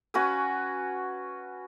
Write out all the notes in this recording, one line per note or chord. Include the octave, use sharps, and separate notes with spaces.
C#4 F#4 B4 G#5